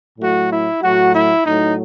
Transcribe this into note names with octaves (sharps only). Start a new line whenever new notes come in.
A2 F#3 A3 F#4
E4
A2 F#3 A3 F#4
E4
A2 F#3 A3 D#4